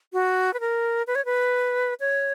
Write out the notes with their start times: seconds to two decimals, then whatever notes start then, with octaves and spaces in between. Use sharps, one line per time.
0.13 F#4
0.53 B4
0.60 A#4
1.07 B4
1.15 C#5
1.25 B4
2.00 C#5